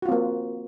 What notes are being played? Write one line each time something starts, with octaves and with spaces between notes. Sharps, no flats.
A#3 C4 F4 F#4